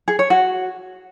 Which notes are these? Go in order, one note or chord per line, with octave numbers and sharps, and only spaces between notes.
G#4
C#5
F#4